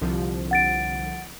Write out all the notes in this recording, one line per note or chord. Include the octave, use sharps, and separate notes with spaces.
C2 D3 F3
F#5 A6 D7